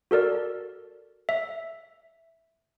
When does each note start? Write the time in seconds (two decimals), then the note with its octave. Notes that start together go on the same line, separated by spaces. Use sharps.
0.11 F#4 A4 A#4 D5
1.29 E5